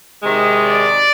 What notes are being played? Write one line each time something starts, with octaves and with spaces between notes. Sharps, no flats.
C3 D#3 G#3
D5